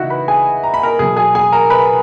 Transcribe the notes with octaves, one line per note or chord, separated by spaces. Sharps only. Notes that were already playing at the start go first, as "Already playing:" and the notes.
Already playing: C#3 E3 D#4 E4 F#4 E5 F#5
B4 B5
G#4 G#5
A#5
B5
A#4 A#5
B2 F#3 G#4 G#5
G#4 G#5
G#4 G#5
A#4 A#5
B4 B5